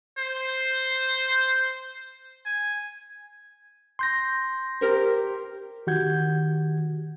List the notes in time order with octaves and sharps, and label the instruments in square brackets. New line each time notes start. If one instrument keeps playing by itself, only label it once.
[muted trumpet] C5
G#5
[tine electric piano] C6 G6 A#6
[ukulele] G4 A#4 C5
[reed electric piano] D#3 F#4 G4 F#5 G6 G#6